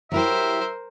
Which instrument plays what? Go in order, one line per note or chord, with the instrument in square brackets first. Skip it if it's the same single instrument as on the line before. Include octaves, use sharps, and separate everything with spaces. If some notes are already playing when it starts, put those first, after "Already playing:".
[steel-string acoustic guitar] F#3 E4 G4 [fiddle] A#4 C5 [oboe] E5